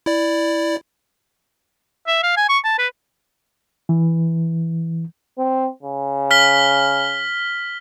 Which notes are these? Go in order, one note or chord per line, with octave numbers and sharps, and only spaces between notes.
E4 D5
E5
F5
G#5
C#6
A5
B4
E3
C4
C#3
F6 B6 G7